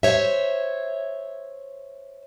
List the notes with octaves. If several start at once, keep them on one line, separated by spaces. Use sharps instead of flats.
C5 C#5 E5